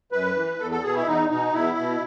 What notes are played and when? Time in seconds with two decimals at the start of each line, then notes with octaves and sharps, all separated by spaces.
0.12 F#2 B4
0.35 E3
0.59 E2 A4
0.71 A4
0.83 B2 G#4
0.95 E4
1.06 E2 D#4
1.29 B2 D#4
1.53 E2 E4
1.77 B2